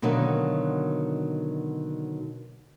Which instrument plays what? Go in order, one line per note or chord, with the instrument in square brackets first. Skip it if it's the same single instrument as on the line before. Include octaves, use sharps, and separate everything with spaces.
[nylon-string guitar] B2 D3 D#3 F#3 A#3